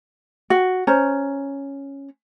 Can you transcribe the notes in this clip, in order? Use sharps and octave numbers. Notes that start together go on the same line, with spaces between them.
F#4
C#4 C5 A#5